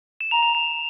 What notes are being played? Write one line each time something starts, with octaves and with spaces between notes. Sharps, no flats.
E7
A#5 F7
F7
F7